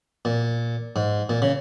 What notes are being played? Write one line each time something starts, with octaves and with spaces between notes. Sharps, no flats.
A#2
G#2
A#2
C#3